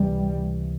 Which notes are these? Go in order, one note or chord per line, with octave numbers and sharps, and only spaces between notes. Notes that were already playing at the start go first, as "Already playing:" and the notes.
Already playing: C#2 C3 E3 G3